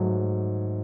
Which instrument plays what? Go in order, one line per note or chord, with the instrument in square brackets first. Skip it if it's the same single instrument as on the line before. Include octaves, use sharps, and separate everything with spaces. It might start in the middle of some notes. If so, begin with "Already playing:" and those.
Already playing: [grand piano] G#2 F#3 A3